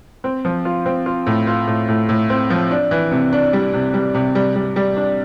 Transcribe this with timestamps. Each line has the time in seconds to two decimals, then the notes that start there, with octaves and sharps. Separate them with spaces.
0.24 C4
0.45 F3
0.65 F4
0.86 C4
1.06 F4
1.26 A2
1.47 F4
1.67 A2
1.88 A2
2.09 A2
2.30 C4
2.50 F3
2.71 D4
2.91 E3
3.11 C3
3.33 D4
3.53 G3
3.73 C3
3.94 G3
4.14 C3
4.35 G3
4.56 G3
4.76 G3
4.97 D4